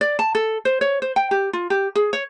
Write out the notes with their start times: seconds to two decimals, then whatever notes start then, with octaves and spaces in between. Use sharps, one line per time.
0.01 D5
0.19 A5
0.35 A4
0.65 C5
0.81 C#5
1.02 C5
1.16 G5
1.31 G4
1.53 F4
1.70 G4
1.96 G#4
2.13 C#5